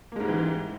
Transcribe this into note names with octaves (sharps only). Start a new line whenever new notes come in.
G#2 E3 G3 G#3 A#3